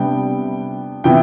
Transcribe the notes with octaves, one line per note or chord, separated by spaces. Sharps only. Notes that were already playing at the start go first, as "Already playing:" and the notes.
Already playing: C3 G3 B3 D4 G5
C3 E3 B3 E4 G5